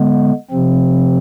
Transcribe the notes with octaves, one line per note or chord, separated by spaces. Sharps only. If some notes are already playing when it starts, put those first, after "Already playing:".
Already playing: D3 G#3 B3
C3 F3 C4